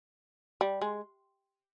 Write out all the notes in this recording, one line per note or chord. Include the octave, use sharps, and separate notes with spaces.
G3
G#3